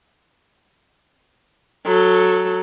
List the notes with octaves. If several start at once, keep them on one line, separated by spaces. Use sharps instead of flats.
F#3 A4